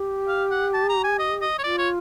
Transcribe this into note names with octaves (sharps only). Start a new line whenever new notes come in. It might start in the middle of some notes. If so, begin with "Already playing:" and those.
Already playing: G4
F5
F#5
A5
A#5
G#5
D#5
D#5
C#5
F4 D5
C#5